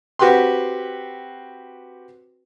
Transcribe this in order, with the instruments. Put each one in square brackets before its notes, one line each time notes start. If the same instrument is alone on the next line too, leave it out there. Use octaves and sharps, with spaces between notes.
[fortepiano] C4 F#4 G4 B4 G5 C6